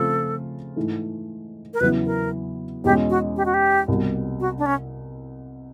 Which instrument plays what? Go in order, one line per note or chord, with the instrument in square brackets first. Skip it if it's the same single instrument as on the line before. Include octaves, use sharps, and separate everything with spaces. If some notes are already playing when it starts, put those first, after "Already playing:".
Already playing: [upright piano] C#3 F3 A3 C4 F4 [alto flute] A4
[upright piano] G#2 E3 A3
[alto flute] A#4
[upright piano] E2 C#3 F#3 B3 E4 [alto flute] B4
[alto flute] A#4
[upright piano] E2 B2 G#3 C#4 [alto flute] G4
[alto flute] F#4
G4
F#4
G4
[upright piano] C2 B2 G3
[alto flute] F#4
D4
C#4